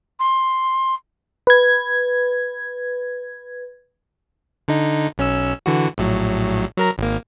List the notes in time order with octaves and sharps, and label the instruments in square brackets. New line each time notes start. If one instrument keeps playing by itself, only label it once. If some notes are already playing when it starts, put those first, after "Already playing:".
[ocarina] C6
[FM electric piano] B4 G#6
[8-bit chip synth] D3 D#4
B1 C#4 E6
D3 E3 F#4
A#1 A2 F#3
F#3 A#4 A#5
G#1 A#3